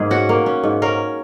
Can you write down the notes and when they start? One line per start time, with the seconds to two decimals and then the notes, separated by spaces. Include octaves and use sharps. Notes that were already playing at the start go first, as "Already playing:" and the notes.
Already playing: G#2 A#3 G#4
0.11 C#4 F#4
0.29 A#3
0.46 C#4
0.64 G#2
0.82 C#4 A#4